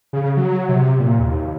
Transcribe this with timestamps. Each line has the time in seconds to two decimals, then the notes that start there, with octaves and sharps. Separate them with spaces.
0.13 C#3
0.37 F#3
0.69 C3
1.00 A#2
1.19 D#2